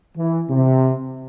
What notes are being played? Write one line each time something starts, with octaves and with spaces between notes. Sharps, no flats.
E3
C3